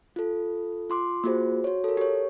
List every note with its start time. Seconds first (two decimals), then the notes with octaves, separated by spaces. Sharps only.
0.16 F4 A4
0.90 F4 C6 D6
1.24 A#3 F4 F#4 G#4 C5
1.64 F#4 C#5
1.84 A4 A#4
1.97 G4 C#5